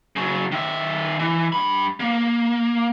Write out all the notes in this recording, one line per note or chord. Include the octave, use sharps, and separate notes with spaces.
C#3 F#3
D#3 E5
E3
G2 B5
A#3